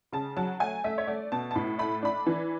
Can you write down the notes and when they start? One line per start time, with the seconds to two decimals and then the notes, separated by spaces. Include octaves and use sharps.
0.12 C#3 A5
0.37 F#3 A5
0.60 A3 G#5
0.84 A3 E5
0.98 C#5
1.08 A3 D5
1.32 B2 A5
1.51 A5
1.55 A2 B5
1.78 A3 B5
2.03 D4 B5
2.26 E3